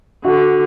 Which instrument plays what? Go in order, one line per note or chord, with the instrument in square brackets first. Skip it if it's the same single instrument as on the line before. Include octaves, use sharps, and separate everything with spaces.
[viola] D3 [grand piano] F#4